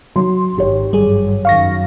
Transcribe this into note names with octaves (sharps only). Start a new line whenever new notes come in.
F#3 C6
G#1 G4 C#5
G#1 G2 F#3 G3 G#4
F#2 D#3 F5 C#6 A#6